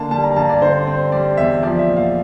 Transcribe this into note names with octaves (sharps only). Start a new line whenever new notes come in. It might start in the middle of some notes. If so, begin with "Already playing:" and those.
Already playing: D3 A#3 F5 A5
G3 A5
A#5
G2 A5
D5
D3 C5
C4
G3 D5
E2 E5
F3 D5
E5
A#2
F5